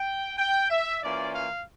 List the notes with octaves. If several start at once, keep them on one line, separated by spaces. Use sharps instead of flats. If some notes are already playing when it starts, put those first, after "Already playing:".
Already playing: G5
G5
E5
E3 A#3 C#4 F4 D5
F5